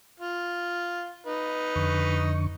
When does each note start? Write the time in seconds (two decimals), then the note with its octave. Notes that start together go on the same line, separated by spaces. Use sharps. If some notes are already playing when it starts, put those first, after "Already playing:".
0.20 F4
1.26 D#4 B4
1.76 F2 D3 C#6